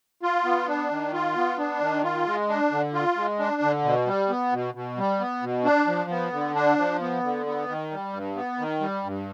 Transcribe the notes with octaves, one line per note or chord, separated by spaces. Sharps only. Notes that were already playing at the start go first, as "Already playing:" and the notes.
F4
B3
D4
D#3
F4
B3
D4
D#3
F4
G#3
D4
D3
F4
G#3
D4
D3
B2
G3
B3
B2
B2
G3
B3
B2
D4
F3
B3
D3
D4
F3
B3
D3
B3
D#3
G3
G2
B3
D#3
G3
G2